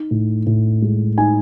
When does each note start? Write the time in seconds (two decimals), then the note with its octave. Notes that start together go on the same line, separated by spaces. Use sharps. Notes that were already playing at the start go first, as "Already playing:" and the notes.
Already playing: D#4
0.11 A2
0.47 A2
0.82 G#3
1.18 D#4 G#5